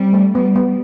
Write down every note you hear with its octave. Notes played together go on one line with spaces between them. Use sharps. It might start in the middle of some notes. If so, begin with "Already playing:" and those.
Already playing: G3 C4
A3
G3 B3
B3